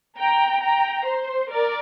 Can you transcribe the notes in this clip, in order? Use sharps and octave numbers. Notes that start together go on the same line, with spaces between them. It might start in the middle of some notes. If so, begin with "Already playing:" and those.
G5 A#5
G5 A#5
C5
A#4 D5